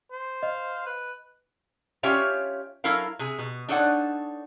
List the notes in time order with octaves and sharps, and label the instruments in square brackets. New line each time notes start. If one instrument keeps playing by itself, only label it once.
[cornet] C5
[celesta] D#5 [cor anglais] F5
[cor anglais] B4
[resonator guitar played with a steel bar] C#4 F4 G4 C#5 E5 F5
F#3 E4 A4 A#4 F5
C3 G#4
B2
D4 D#4 A4 C#5 D5 F#5